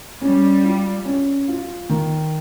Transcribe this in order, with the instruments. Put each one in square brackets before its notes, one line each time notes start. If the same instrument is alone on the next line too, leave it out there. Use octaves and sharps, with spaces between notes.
[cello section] G3 [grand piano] C#4
[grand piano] F4
C#4
F4
D#3